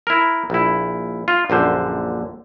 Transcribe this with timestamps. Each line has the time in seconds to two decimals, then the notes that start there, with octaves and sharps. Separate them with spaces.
0.07 E4 A#4
0.50 A#1 E4
1.28 F4
1.50 A#1 F#2 D3 C5